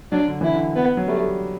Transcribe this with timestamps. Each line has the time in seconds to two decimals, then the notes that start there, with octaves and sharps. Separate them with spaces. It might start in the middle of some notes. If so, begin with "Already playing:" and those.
0.12 F#3 D4
0.28 D3
0.41 E3 E4
0.54 D3
0.76 B3
0.97 F#3
1.08 G3 A3